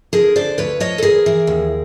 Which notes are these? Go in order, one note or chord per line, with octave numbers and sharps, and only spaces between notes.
D3 G#4 A#4
D3 C5 D5
D2 B4 C#5
F3 C#5 D#5
A4
E3 G#4 A#4
E3
D#2